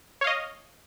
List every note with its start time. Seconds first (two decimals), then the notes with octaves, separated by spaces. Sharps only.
0.21 C#5
0.24 F5
0.27 D#5